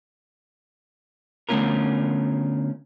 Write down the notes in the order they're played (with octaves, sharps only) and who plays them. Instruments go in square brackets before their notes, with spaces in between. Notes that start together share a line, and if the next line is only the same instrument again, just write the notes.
[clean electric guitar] D3 A3 B3 C#4 F4 A#4